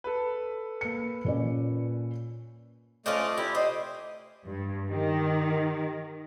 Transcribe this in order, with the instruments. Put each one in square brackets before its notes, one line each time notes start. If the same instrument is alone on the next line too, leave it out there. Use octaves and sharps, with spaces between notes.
[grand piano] A4 B4
[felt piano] A#3 C#7
A#2 C#4 D5
[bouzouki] F3 C#4 F4 [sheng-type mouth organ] A3 D5 D#5
[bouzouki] E4 [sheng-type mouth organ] G4
[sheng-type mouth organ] C5 [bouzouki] D#5
[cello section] G2
[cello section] D#3 [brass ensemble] G4